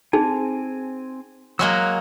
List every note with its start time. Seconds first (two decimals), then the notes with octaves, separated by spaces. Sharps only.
0.13 C4 D#4 G#4 G#5
1.59 F#3 G#3 A#3 E6 F#6